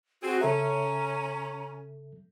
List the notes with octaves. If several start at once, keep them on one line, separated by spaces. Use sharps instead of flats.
C4 F#4 G#4
C#3 C#4 A4 E5 A#5